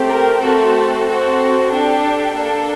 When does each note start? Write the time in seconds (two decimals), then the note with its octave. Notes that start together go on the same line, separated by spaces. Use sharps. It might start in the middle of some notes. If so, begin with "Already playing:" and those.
Already playing: A3 C4 G4
0.09 A#4
0.41 A3 C4 F#4 A4
1.06 C4 F#4 A4
1.70 D4 G4 A4
2.35 A#3 D4 A4